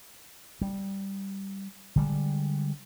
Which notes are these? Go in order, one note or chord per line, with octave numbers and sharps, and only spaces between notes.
G3
D3 G3 G#3